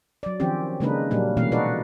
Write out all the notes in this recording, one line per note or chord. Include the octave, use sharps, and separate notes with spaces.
F#3 D5
D#3 F3 C4 C#4 G4
C#3 G#3 A#3 D4 D#4 B4
A#2 F#3 G3 A#3 D4 D#4
B2 E3 G#3 A#3 C#4 F5
D#4 F#4 A4 B4 D5